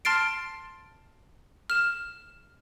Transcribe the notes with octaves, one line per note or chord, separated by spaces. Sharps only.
A5 C6 F6 A6 C7 D7
F6 E7